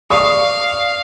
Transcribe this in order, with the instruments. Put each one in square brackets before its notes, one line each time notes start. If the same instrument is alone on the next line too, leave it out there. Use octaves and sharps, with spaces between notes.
[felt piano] D5 C#6 D#6 [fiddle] F5